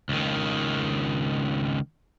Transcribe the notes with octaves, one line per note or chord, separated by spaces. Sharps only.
C#2 D#3